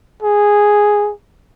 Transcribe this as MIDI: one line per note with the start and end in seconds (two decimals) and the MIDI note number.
0.23 1.12 68